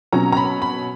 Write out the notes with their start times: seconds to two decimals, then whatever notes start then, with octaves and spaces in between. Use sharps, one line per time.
0.13 B2 F#3 C#4 A#5
0.32 A#5
0.37 B5
0.62 B5